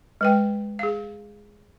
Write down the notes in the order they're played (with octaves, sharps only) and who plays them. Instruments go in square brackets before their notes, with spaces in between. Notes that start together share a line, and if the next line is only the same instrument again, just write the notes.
[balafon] G#3 B4 G5
G#4 F5